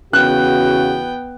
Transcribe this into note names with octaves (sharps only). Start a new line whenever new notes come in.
E2 C#3 B3 F#4 G5 F#6